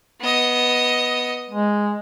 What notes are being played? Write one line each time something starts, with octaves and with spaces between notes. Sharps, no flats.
B3 D#5
G#3